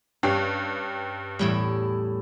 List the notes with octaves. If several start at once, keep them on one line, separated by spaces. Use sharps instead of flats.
G2 C#4 G4 F5
E2 A2 G3 E4